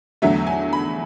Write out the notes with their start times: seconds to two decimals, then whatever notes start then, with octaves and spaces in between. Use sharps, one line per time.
0.22 E2 D3 F#3 A3 E5
0.47 G#5
0.73 B5